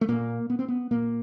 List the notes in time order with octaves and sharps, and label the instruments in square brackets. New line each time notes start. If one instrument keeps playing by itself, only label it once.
[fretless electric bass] A3
A#2 A#3
B3
C4
B3
A#2 A#3